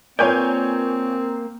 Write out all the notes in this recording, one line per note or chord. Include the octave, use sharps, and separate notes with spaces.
A#3 C4 F4 B4 C#5 D5 G#5 G6